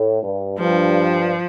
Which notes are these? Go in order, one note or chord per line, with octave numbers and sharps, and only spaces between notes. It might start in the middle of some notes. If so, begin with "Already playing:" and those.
Already playing: A2
G2
G2 F3